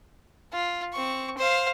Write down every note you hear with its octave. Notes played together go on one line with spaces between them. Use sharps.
F4
C4 C#6
C5 F5